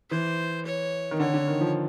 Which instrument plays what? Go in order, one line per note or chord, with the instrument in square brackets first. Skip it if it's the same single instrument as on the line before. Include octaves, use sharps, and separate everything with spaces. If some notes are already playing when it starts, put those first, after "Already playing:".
[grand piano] E3 [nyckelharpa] C5
[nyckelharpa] C#5
[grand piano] D#3
[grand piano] D3 [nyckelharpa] C#5
[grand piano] D3
D#3
F3